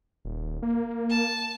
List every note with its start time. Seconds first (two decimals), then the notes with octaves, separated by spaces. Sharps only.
0.25 D#1
0.63 A#3
1.10 A5